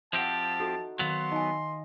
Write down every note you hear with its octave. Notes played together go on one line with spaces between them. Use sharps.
F3 C4 G4 E5 F#5 A5
D#4 F#4 A4
D#3 F#3 B3 F5 C6
D#4 D#5 G#5